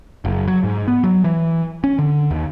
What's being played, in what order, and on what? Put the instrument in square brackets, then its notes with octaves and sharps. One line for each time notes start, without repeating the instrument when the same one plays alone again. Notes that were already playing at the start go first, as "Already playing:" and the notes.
[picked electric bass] F#1
F#3
G#2
B3
F#3
E3
C#4
D3
D#2